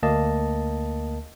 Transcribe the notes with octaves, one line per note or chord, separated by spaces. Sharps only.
D2 A#3 D#5 A5